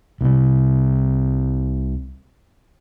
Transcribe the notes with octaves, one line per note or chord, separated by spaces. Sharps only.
C2 C3